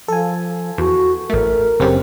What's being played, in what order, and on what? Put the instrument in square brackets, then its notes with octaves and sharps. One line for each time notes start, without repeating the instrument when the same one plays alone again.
[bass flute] F3 [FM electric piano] A4 G#5
[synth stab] E2 [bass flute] F#4
[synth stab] A1 A3 [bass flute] A#4
[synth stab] G1 F#2 [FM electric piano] C#3 C4 G4